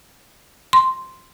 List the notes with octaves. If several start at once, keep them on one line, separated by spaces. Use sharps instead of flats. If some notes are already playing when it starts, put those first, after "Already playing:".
C6